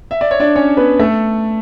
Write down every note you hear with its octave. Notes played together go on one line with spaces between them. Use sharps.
E5
D5
C#5
D4 D5
C#4 C#5
B3 B4
A3 A4